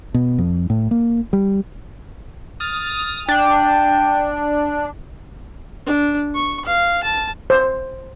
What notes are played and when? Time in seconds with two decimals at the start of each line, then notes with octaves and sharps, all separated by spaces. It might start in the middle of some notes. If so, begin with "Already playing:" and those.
0.14 B2
0.38 F2
0.70 A2
0.91 A#3
1.33 G3
2.60 D#6 F6 A6
3.28 D4 G5
5.86 D4
6.35 C#6
6.65 F5
7.03 A5
7.50 C5